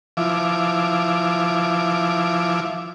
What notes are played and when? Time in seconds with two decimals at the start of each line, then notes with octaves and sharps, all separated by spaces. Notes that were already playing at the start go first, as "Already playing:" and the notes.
0.17 F3 E4 D6